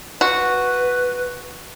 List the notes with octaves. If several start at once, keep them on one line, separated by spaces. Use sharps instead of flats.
F#4 B4